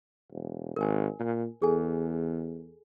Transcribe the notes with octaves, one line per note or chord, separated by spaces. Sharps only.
E1
G#1 A#4 G#5
A#2
E2 G#4 A4 G#5